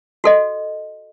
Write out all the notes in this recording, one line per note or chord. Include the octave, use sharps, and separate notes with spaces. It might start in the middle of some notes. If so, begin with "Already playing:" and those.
F#4 A4 D#5